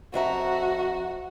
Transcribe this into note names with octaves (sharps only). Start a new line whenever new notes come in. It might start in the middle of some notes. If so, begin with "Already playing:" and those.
F2 F#4 E5 A#5